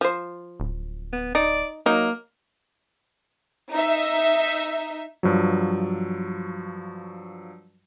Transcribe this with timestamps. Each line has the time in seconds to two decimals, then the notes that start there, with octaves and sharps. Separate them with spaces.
0.01 F3 C5
0.60 D1
1.13 B3
1.35 D#4 D5
1.86 F#3 A#3 D#4
3.71 D#4 E5
5.23 G2 F3 F#3